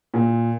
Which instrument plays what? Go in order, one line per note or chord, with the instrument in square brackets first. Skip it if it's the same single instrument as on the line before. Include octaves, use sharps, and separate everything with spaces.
[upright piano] A#2